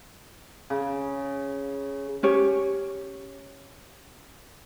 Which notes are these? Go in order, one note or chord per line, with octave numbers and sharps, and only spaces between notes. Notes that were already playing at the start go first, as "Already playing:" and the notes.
C#3
C#4 G4 C#5